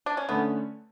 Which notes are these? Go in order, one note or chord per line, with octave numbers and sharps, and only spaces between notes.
D4
C#4
D3 A3 B3 C#4